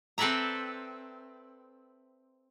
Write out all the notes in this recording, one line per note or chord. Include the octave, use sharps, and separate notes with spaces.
C4 A4 B4 D5 E5 A#5